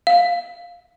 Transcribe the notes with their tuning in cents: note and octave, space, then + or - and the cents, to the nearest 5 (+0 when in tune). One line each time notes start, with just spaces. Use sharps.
F5 +10